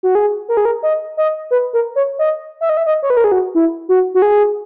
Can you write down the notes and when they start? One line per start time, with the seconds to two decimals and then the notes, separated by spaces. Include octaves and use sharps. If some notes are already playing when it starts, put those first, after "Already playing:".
0.03 F#4
0.15 G#4
0.49 A#4
0.57 G#4
0.65 A#4
0.83 D#5
1.17 D#5
1.51 B4
1.73 A#4
1.96 C#5
2.19 D#5
2.61 E5
2.69 D#5
2.77 E5
2.86 D#5
3.03 C#5
3.10 B4
3.17 A#4
3.24 G#4
3.32 F#4
3.55 E4
3.89 F#4
4.14 F#4
4.22 G#4